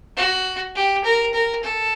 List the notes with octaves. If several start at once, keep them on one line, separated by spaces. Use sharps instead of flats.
F#4
G4
A#4
A#4
A4